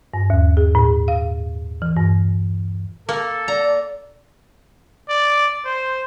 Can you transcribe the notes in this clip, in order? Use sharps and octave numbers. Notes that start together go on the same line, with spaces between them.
G2
D#2
G#4
A2
F5
E3
G2
A#3 A4
D5 A#5
D5
C5